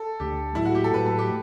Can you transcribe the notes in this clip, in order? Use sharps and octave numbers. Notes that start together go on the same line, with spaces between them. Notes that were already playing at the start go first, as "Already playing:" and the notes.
Already playing: A4
D2 D3 A3 G4
A2 F#3 A3 E4
F#4
G4
A4
A2 F#3 A3 B4
A4
G4